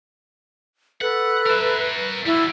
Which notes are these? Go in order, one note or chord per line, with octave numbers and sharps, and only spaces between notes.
A4 B4 F#5
A#4 E5
G3 E4 F#4